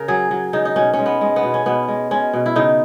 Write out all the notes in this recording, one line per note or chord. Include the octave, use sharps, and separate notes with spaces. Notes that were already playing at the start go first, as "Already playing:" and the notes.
Already playing: C#3 A#4
F#3 G#4
F#3
C#3 D#4
D#4
B2 C#4
C#4
G#3
B3
G#3
B3
B2
C#4
B2 B3
G#3
G#3 C#4
B2
E4
C#3 D#4